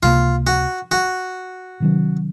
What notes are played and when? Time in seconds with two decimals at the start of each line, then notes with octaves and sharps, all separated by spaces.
0.03 C#2 C3 F3 A#3 F4
0.47 F#4
0.92 F#4
1.80 C3 D#3 F#3 C#4